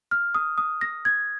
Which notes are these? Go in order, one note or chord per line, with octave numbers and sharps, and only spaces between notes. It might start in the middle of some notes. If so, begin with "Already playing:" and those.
F6
D#6
D#6
A#6
G#6